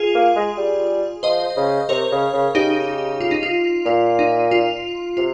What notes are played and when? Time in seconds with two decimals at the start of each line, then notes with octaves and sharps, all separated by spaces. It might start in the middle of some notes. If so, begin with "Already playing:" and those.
Already playing: F4 G#4
0.15 A#3
0.36 G#3
0.57 G3
1.23 F3 C5 D#5
1.56 C#3
1.89 C3 A#4 C#5
2.11 C#3
2.33 C#3
2.55 C#3 D#4 G4
3.21 F4
3.31 D#4
3.43 F4
3.85 A#2 F4
4.19 D#4
4.51 F4
5.17 C3 F4